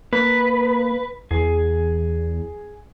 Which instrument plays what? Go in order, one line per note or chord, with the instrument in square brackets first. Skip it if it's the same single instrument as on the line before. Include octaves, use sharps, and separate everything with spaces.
[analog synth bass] A#3 [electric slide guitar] B4
[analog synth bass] E2 [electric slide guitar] G#4